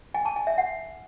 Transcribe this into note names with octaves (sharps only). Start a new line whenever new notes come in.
G#5
A5
G#5
E5
F#5